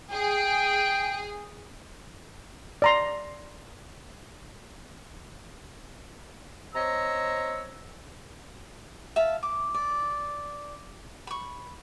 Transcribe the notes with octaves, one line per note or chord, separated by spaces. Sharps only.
G#4 G5
D5 A#5 C6
C4 C#5 D#5 A#5 E6
E5 F5 A5
D6
D5
B5 C#6